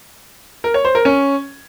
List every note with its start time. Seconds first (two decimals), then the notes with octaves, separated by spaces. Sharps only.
0.64 A#4
0.74 C#5
0.85 C5
0.95 A#4
1.05 C#4